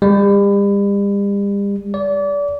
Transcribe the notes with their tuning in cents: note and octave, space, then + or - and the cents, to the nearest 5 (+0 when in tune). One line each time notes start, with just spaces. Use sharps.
G3 +40
D5 -30